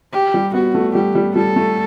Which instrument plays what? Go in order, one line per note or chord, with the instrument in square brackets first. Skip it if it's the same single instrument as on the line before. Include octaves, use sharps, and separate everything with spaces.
[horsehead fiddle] G4
[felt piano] G3
[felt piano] B3 [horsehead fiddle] F#4
[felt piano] A3
[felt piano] G3 [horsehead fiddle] G4
[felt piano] G3
[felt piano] G3 [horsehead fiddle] A4
[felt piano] A3